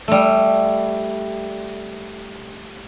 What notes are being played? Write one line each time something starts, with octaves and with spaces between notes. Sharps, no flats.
G3 A3